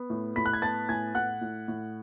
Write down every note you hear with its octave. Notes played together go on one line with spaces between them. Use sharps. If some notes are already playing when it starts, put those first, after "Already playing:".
Already playing: B3
A2
A2 B5 B6
F#6
G#6
B3 A5 A6
A2 G#5 G#6
A2 F#5 F#6
A2
A2